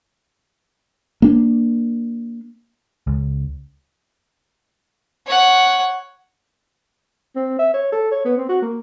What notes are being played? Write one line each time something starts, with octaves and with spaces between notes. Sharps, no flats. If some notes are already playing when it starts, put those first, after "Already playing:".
A#3 D4
C#2
C#5 F#5
C4
E5
C#5
A4
C#5
B3
C4
F#4
A#3